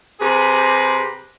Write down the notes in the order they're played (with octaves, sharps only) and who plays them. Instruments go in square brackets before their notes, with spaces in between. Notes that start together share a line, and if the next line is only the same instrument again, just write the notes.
[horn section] C3 G4 G#4 B4 A#5 C6